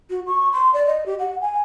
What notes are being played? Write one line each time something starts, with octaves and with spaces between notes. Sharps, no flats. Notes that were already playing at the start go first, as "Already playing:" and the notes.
F#4
C#6
C6
D5
D#5
G4
F#5
G#5